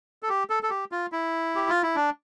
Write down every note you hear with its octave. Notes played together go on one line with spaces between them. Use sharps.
A4
G4
A4
A4
G4
F4
E4
G4
F4
E4
D4